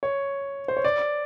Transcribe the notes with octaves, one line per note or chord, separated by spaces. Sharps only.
C#5
C5
C#5
D5